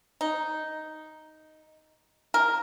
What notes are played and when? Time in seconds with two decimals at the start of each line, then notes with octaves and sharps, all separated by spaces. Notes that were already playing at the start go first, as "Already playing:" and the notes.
0.21 D#4
2.34 A#4